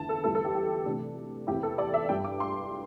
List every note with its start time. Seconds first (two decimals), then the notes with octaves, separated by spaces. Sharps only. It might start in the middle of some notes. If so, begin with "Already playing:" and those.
Already playing: E2 D3 E4 A5
0.09 A4
0.23 E2 E3 G3 E4 A4
0.35 A4
0.45 G4
0.55 G4
0.85 C3 E3 A3 D4
1.47 E2 E3 C4 E4 G4
1.63 A4
1.78 D5
1.94 E5
2.09 G2 G3 D4 G5
2.24 D6
2.40 C6